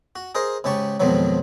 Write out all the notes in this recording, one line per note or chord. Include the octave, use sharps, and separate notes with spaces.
F#4
G#4 A#4 C5 D#5
G#2 C#3 G4 A5 C#6
F2 G#2 B2 D#3 F3 F#3